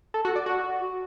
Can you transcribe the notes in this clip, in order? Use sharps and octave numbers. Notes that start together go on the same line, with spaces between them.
A4
F#4
D5
F#4